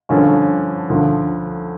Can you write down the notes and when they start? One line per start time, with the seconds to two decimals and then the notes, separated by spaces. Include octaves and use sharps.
0.09 G2 D3 F3 C#4
0.90 D2 D3 F3